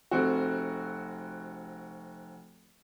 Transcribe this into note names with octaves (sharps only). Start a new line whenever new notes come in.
F1 C4 F#4